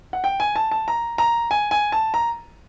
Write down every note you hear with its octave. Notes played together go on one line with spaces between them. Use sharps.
F#5
G5
G#5
A5
A5
A#5
A#5
G#5
G#5
A5
A#5